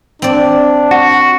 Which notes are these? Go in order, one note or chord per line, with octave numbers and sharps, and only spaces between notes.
C4 D4 D5
F#4 F#5